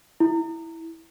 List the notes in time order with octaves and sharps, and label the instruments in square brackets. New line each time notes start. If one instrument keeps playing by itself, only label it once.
[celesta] E4